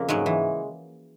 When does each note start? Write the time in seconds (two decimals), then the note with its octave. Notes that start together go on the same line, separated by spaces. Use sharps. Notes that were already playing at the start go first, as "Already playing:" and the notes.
Already playing: F2 C#3 A#3
0.09 G#2 F#3 G#3
0.26 E3